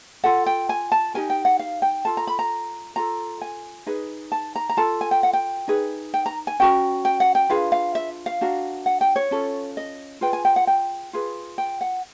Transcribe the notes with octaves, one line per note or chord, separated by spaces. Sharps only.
F4 A4 F#5
G5
G#5
A5
D#4 G4 A#4 G#5
G5
F#5
F5
G5
F4 A4 A5
A#5
B5
A#5
F4 A4 A#5
G#5
D#4 G#4 B4
A5
A#5
A#5
F4 A4 A5
G#5
G5
F#5
G5
D#4 G#4 B4
G5
A#5
G#5
C#4 F#4 A#4 G5
G5
F#5
G5
D4 F4 G#4 B4 F5
F5
E5
F5
D4 F#4 A#4
F#5
G5
C#5
C#4 F4 A4
D#5
F4 G#4 B4 G5
G#5
G5
F#5
G5
F4 G#4 B4
G5
F#5